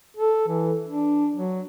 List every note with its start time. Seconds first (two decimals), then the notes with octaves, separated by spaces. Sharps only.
0.17 A4
0.48 E3
0.86 D4
1.34 F#3